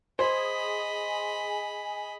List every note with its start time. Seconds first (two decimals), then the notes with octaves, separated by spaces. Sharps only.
0.19 G#4 C5 D#5 B5